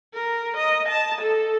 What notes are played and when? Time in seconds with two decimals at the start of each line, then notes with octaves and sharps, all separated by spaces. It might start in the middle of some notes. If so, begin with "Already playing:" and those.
0.14 A#4
0.57 D#5
0.89 A5
1.21 A4